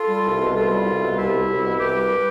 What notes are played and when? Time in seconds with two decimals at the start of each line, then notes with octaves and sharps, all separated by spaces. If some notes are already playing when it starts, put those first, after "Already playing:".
Already playing: F4 A4
0.09 G3
0.25 C2
0.40 B2
0.54 C2 F4 A4
0.70 G3
0.86 C2
1.01 B2
1.16 C2 E4 G4
1.32 G3
1.47 C2
1.63 B2
1.78 C2 G4 B4
1.94 G3